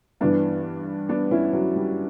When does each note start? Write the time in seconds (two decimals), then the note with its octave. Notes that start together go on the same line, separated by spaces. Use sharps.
0.21 G2 E3 B3 D4
1.09 B3 D4
1.31 C#4 E4
1.53 F#3
1.76 G3